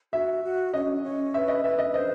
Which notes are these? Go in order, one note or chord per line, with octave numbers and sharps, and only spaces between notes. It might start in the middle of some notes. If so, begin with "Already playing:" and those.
F#4 E5
F#4
C#4 D#5
C#4
B4 E5
D#5
B4 E5
D#5
C5 D#5